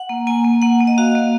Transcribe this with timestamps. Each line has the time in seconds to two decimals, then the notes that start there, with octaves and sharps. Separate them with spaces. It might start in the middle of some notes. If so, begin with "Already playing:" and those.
Already playing: F#5
0.09 A#3
0.27 A#3 G#5
0.44 A#3
0.62 A#3 F#5
0.80 A#3
0.87 D#5
0.98 F#4 F5
1.15 A#3